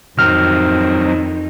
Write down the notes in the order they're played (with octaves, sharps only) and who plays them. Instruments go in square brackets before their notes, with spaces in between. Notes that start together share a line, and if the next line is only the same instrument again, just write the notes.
[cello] F2 D#4 [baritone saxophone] D#3 [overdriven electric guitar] F#3 C4 [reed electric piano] F6